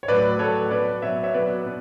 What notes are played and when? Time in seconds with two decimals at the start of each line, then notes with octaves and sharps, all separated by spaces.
0.03 C#5
0.08 A2 F#3 B4 D5
0.39 A2 F#3 A4 C#5
0.71 B2 F#3 B4 D5
1.02 B2 F#3 C#5 E5
1.23 C#5 E5
1.34 B2 F#3 B4 D5
1.66 B2